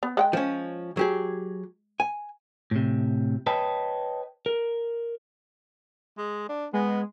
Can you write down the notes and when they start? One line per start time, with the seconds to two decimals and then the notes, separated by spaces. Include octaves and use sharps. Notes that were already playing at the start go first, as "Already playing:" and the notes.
0.03 B3
0.17 G#3 F#5 G5
0.33 F3 C#4
0.97 F#3 G4 G#4
2.00 G#5
2.71 A2 C3
3.47 B4 C#5 D#5 G5 A5
4.46 A#4
6.18 G#3
6.49 D4
6.73 G#3 B3